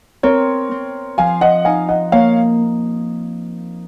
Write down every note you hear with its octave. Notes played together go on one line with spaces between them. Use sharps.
C4 A#4 C#5
C4
F3 F5 G#5
D#5 F#5
D#4 F5 G#5
D#5 F#5
A#3 C#5 F5